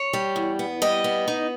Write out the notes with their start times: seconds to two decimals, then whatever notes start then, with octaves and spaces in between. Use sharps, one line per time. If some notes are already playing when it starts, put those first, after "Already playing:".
Already playing: C#5
0.13 G3
0.36 E2
0.59 B3
0.82 G3 D#5
1.04 B3
1.28 D#4